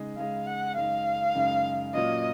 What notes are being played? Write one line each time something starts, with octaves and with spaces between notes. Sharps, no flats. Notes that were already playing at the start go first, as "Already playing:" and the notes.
Already playing: C#3 G#3 D#4 G#4 D#5
C#3 G#3 D#4 G#4 D#5 F5
F#5
F#2 C#3 G#3 D#4 F5
F#2 C#3 G#3 D#4
A#2 F#3 A#3 C#4 F4 D#5